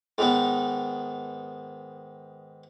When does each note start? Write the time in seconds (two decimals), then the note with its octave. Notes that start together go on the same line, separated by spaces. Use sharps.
0.18 G#2 D#3 B3